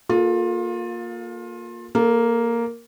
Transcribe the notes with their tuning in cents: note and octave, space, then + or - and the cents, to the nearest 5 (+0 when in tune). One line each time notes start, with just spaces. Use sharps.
A#3 +0 F4 +25 A4 -25
A#3 +0 A4 -30